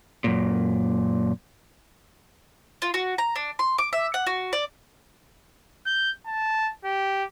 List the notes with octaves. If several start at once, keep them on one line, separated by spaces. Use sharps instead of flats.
F#2 A#2
F4
F#4
A#5
D4
C6
D6
E5
F#5
F#4
D5
G6
A5
G4